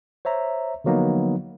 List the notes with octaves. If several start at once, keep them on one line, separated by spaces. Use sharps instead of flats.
C5 C#5 E5 A#5
D3 F3 F#3 A#3 B3 D#4